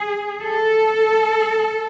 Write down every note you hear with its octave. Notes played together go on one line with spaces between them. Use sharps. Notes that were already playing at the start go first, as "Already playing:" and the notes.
Already playing: G#4
A4